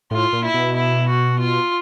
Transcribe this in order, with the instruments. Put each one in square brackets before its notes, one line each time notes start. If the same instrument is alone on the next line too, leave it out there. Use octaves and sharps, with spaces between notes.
[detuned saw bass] A2 [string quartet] F4
[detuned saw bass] A#2
[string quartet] E4
[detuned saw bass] B2
[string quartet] E4
F#4
F4